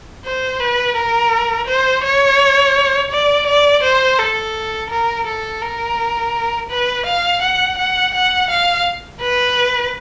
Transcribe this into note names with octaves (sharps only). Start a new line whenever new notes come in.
C5
B4
A#4
C5
C#5
D5
D5
C5
A4
A#4
A4
A#4
B4
F5
F#5
F#5
F#5
F5
B4